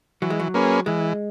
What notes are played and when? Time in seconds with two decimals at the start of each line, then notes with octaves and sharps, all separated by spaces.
0.22 E3 F#3
0.30 G#3
0.40 F#3
0.54 A#3 C#4 G#4 B4
0.86 E3 G#3